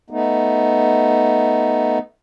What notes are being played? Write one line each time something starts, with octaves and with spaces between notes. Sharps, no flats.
A3 B3 D#4